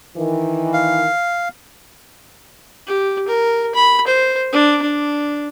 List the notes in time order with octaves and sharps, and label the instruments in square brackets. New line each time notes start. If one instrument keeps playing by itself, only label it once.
[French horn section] D#3 E3
[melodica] F5
[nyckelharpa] G4
A#4
B5
C5
D4
D4